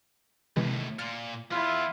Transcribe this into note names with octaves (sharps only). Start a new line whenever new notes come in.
D#2 A2 C3 E3 G#3
A#2 C6 F6
E2 B3 E4 F4